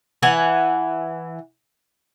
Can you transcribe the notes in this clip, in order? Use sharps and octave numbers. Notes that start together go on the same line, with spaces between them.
E3 F#5 G#5